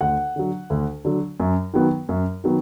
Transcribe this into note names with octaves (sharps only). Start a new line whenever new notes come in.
D2 F#5
D3 F#3
D2
D3 F#3
F#2
D#3 F#3 B3
F#2
D#3 F#3 B3